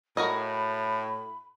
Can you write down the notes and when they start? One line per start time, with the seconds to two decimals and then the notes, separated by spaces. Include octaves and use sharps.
0.17 A2 F#4 A#4 D#5 B5